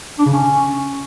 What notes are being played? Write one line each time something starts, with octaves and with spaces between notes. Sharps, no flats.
D4
C#3
C#4